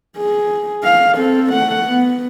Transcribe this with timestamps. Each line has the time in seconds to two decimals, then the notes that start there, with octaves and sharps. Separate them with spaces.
0.17 G#4
0.83 F5
1.15 C4 A4
1.52 A3 F#5
1.86 B3